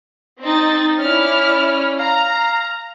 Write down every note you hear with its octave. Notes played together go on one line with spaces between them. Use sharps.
C4 D#4 A6
C#4 E4 D5 F6
F5 A#5